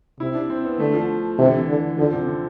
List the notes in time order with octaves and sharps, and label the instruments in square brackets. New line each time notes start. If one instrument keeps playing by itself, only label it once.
[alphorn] C3 [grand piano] E4
[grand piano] D4
C4
B3
[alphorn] D3 [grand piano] A3
[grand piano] F3
[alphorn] C3 [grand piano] E3
[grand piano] D3
E3
[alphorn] D3
[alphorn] D3 [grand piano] F3
[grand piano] C3
D3